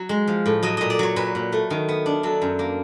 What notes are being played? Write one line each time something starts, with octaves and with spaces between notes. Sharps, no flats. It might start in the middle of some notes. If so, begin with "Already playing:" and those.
Already playing: F#3
G#3
F3
A2
F#3 D#5
A#2 D#5
D5
F#3 C#5
A#2 B4
A#2
A3
D#3
B3
D4
F#3 A4
F#2
A#3